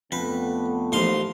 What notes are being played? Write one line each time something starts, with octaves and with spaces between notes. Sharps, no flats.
F2 D3 A3 B3 B4
A1 F3 A#3 D#4 F5 C6